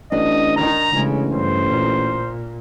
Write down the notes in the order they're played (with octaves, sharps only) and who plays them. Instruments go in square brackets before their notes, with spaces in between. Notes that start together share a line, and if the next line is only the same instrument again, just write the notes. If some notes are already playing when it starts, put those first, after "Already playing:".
[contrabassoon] A1 [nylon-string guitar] D4 [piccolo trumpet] D#5
[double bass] D#3 D#4 [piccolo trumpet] A#5
[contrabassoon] A1 [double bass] C#3 G#3
[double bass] G2 [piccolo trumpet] C5
[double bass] A#2